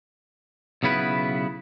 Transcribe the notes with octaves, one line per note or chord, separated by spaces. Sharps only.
B1 C#3 B3 E4 B4